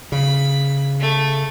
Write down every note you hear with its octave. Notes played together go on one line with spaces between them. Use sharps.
C#3 B5
A3